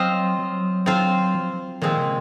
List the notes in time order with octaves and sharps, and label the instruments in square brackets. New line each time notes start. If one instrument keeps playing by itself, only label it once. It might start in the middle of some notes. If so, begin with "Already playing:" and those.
Already playing: [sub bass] F#3 [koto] C4 F4 C5 D#5
[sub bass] F#3
[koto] C4 F4 C5
[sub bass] F3
[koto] A#2 G#3 C4 [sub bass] D#3
[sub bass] C#3